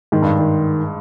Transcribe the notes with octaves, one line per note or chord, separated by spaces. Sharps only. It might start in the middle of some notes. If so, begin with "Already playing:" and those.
G#2 D#3
G2
D#3